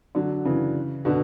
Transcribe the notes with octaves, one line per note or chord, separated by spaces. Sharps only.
D3 F#3
C#3 E3
B2 D3